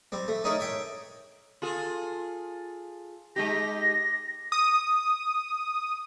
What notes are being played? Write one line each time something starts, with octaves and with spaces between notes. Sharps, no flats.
G3 C4
A3
A3 C#4 D#4 G#4 A#4
C#5 E5 G5
F4 G#4 A4
G#3 D#4 G4 A#6
D#6